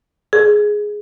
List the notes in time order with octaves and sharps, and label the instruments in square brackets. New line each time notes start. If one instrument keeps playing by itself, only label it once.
[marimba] G#4